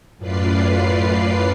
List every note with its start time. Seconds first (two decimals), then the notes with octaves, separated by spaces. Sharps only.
0.17 F#2 A2 F4 B4 D5 C7